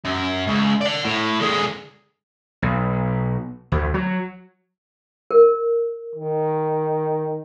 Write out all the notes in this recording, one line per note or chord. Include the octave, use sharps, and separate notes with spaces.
F#2
C#2
D5 F#5
A2
D3 G#3
B1
D2
F#3
A#4
D#3